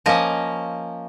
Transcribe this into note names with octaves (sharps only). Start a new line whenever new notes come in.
F3 A#3 C#4 D#5